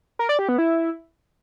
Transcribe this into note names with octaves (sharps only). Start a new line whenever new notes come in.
A#4
D5
G4
B3
E4